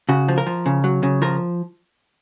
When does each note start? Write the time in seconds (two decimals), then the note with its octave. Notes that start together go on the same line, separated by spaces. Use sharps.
0.09 C#3 F#4
0.28 F3
0.38 A#4
0.46 F3
0.66 C#3
0.84 F#3
1.03 C#3
1.22 F3 A#4